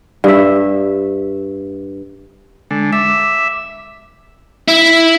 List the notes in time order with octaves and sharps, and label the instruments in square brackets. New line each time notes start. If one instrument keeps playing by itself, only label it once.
[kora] G2 E5
[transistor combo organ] D3 [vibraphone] G#3
[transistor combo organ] E5 [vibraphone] D6
[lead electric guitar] E4